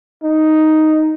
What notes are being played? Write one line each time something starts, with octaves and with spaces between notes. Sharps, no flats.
D#4